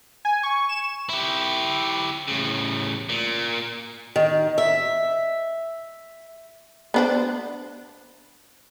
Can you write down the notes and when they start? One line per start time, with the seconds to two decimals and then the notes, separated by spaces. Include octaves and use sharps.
0.25 G#5
0.43 C#6
0.69 E7
1.09 E4 G4
2.28 A2 C#3
3.09 A#2
4.16 D#3
4.58 E5
6.94 B3 D4 C5